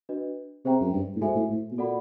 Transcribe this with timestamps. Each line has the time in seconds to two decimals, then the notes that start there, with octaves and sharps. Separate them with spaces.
0.09 D4 F#4 B4 D#5
0.65 C3 G#4 C5 E5 G5 A#5
0.81 F#2
0.93 G2
1.16 A2
1.21 G#2 F#4 A4 C5 E5 G#5
1.36 A2
1.50 A2
1.71 B2
1.78 A#2 F#4 A4 D5 F#5 B5